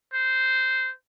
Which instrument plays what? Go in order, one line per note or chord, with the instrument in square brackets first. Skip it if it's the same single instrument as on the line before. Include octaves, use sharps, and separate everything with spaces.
[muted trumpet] C5